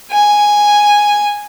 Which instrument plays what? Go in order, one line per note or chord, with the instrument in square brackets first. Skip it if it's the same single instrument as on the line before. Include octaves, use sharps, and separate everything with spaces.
[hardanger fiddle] G#5